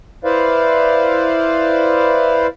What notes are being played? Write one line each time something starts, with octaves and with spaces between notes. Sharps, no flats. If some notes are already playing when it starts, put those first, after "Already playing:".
E4 B4 C5 D5 F5